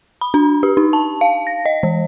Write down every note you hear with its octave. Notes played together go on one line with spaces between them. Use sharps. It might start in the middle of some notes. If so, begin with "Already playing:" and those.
B5
D4
G4
D#4
A5
F5
A#6
D#5
E3